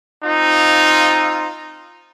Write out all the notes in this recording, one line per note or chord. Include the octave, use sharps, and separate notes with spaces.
C4 D#4 F4